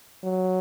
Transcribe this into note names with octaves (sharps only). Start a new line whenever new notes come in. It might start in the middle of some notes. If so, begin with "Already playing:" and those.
F#3